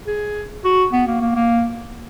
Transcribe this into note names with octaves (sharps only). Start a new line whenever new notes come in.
G#4
F#4
B3
A#3
A#3
A#3